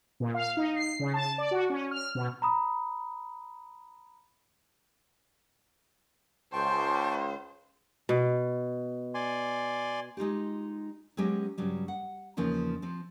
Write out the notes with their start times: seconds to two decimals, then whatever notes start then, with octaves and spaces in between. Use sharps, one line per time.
0.20 A#2
0.34 F5
0.57 D#4
0.76 C7
0.99 C#3
1.14 A5
1.38 D5
1.51 F#4
1.70 C#4
1.91 F6
2.15 B2
2.42 A#5 B5 D#6
6.53 C#2 C5 G5 A5 C#6
8.09 B2
9.15 D5 G#5 C6
10.17 G#3 D#4 F4 G4
11.17 F#3 G#3 B3 C#4 G4
11.58 G2 C#3 F#3 G3
11.88 F#5
12.37 E2 C#3 F3 A#3 C#4 D#4
12.82 F3 C4